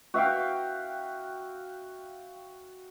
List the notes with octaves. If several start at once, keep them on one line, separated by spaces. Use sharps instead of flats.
F#4 E5 F5 G5